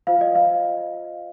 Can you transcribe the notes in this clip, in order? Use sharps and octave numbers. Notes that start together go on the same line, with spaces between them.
F4 C5 F5
D#5
F5